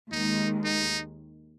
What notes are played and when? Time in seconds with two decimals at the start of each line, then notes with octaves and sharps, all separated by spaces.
0.12 D#2 D#3 G#3 D#4
0.64 D#4